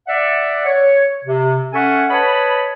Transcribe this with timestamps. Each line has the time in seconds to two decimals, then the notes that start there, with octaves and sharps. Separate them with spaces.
0.07 D5 E5 F#5
0.65 C#5
1.25 C3
1.73 C#4 A4 E5 F#5 G#5 C#6
2.10 B4 C#5 D#5 A5 B5